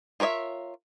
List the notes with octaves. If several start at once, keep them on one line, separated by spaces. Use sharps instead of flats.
F4 A#4 C#5 D#5 E5